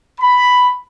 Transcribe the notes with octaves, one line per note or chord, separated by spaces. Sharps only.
B5